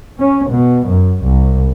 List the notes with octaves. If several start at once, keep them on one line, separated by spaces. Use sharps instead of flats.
C#4
B2
F#2
C2